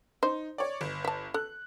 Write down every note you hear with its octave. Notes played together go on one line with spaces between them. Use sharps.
D#4 C5
C#5 D5
G1
E5 A5
A4 F#6